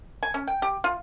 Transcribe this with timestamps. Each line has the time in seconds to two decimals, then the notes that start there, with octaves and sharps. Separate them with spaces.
0.23 G#5
0.34 C#4
0.47 G5
0.62 G4
0.84 F4